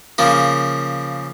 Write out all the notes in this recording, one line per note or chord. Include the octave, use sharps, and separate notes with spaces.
C#3 F3 A#3